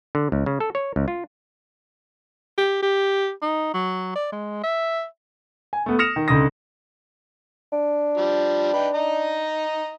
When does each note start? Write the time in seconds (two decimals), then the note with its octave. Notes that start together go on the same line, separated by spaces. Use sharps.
0.15 D3
0.32 C#2
0.46 C#3
0.60 A4
0.75 C#5
0.96 C#2
1.08 F4
2.58 G4
2.83 G4
3.42 D#4
3.74 F#3
4.16 D5
4.32 G#3
4.64 E5
5.73 G#5
5.86 A3 B3
5.99 D#6 F6 A#6 C#7 E7 F7
6.16 D#3
6.28 C#2 D3 D#4 D#6 A#6
7.72 D4
8.17 F3 G3
8.73 D#4 B4 G5
8.94 D#4 D#5 A#5